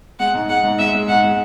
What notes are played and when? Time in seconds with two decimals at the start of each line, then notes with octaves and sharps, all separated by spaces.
0.20 G#3 F#5
0.34 G#2
0.49 G#3 F#5
0.64 G#2
0.79 G#3 E5
0.95 G#3
1.08 G#2 F#5
1.24 G#3